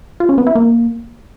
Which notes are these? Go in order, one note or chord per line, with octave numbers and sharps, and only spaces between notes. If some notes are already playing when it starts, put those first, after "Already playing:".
F4
C#4
B3
E4
A#3